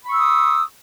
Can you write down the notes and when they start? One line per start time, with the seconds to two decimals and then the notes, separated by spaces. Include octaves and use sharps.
0.05 B5
0.09 C#6
0.13 E6
0.18 D#6